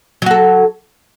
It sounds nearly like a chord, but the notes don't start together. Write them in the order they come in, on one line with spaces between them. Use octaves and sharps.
F#3 F#4 A4